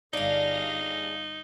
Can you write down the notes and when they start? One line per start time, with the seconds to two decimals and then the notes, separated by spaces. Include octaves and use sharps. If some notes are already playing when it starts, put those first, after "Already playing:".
0.13 G1 D4 D#4 G#4 F5 A#6